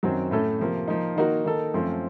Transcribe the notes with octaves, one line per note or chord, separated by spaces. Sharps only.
F#2 D#3 F#3 C4 F#4
A2 A3 C#4 A4
C3 F3 A#3
F3 A#3 D#4
D#3 A#3 D#4 F#4 A#4
D#3 A#3 D#4 A4
F#2 F3 A3 C4